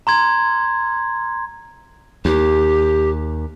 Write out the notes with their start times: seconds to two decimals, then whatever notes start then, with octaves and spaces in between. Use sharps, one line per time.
0.07 A#5 C6 G#6
2.25 D#2 G4